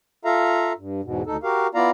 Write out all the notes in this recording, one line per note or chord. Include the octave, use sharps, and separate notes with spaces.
F4 A4 E5 F5 A#5
G2
E2 G#2 B2
D2 D#4 A4
F#4 G4 A#4 F5
B3 E4 F4 D5 F5 A#5